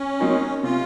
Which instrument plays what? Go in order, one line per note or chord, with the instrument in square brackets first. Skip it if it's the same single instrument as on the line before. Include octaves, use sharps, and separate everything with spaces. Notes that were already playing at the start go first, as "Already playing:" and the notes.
Already playing: [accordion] C#4
[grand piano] F#3 C4 D#4 A#4
[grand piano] C3 [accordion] F4